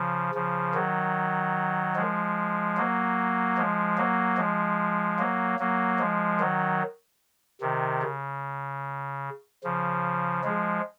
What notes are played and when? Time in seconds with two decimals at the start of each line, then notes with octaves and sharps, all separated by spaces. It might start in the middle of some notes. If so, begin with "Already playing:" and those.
Already playing: C#3 F3
0.34 C#3 F3
0.74 D#3 F#3
1.96 F3 G#3
2.77 F#3 A#3
3.58 F3 G#3
3.97 F#3 A#3
4.37 F3 G#3
5.18 F#3 A#3
5.59 F#3 A#3
5.99 F3 G#3
6.40 D#3 F#3
7.61 C3 D#3
8.02 C#3
9.64 C#3 F3
10.44 F3 G#3